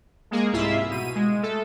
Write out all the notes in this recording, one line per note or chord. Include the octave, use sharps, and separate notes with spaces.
G#3 A#3 G#4
C2 G#2 E4 F4 E5
B2 D#7
G#3
A3 A4